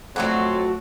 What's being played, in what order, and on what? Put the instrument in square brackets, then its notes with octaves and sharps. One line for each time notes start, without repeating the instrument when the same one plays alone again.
[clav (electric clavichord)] F2 [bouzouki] F#3 D4 F#4 [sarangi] A3 [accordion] C#5 C6